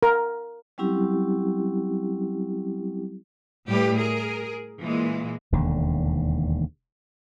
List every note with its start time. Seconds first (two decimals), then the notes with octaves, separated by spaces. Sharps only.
0.03 A#4
0.78 F#3 G3 C4 C#4 E4 G4
3.67 A2 G3 A3 G4 B4
3.96 G#4 A#4
4.80 A#2 E3 G#3 A#3
5.52 E1 D#2 D3